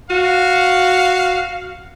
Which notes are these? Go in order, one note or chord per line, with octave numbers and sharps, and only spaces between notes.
F#4 F5